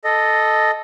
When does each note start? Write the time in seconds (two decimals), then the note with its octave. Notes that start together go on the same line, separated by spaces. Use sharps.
0.04 A4 D#5